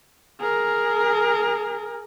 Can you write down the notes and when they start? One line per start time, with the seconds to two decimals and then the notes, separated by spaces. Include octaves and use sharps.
0.40 G#4 A#4